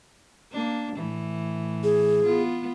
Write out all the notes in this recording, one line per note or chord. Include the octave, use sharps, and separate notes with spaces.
A#3 D4
A2 E3
G#4
B3 F4